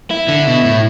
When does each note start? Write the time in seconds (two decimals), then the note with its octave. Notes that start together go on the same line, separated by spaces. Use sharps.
0.11 E4
0.28 D3
0.47 B2
0.65 A2